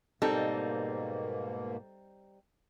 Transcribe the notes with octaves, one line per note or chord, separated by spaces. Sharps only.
G#2 B2 G3 A#3 C4 D#4 A4